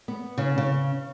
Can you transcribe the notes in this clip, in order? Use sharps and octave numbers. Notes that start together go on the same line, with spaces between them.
B3
C#3
C#3